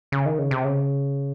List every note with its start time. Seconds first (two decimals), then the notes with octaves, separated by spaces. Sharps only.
0.12 C#3
0.26 D#3
0.39 C#3
0.51 C3
0.65 C#3